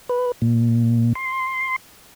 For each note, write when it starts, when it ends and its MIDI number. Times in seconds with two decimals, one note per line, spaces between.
0.09 0.32 71
0.42 1.13 46
1.15 1.76 84